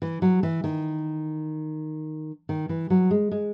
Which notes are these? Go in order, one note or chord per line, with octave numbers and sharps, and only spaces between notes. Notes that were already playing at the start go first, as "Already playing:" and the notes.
E3
F#3
E3
D#3
D#3
E3
F#3
G#3
G#3